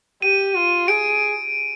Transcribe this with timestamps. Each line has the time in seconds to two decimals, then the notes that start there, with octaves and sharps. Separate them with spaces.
0.22 G4 D#7
0.55 F4
0.88 G#4 D7